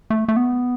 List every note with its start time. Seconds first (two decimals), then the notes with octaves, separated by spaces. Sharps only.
0.10 A3
0.28 A3
0.36 B3